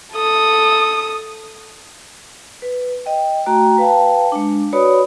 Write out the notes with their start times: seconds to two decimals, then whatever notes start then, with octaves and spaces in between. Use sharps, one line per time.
0.14 A4 D#6
2.62 B4
3.06 D#5 G5
3.46 A3 F#4 G5 A#5
3.78 B4 F5 G5 A5
4.32 G#3 D4
4.73 F#4 B4 C#5 D5 B5 D#6